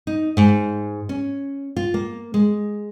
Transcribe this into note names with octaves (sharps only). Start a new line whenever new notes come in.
D#4
G#2
C#4
F4
A#3
G#3